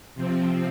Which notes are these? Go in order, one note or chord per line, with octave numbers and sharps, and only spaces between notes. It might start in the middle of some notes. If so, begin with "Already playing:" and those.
C3 F3 C4